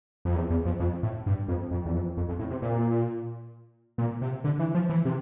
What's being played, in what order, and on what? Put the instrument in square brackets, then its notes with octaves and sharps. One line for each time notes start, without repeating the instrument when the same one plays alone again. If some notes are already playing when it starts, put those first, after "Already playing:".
[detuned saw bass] F2
E2
E2
F2
F2
A2
G2
F2
F2
E2
F2
F2
F2
A2
C3
A#2
A#2
C3
D3
E3
F3
E3
C3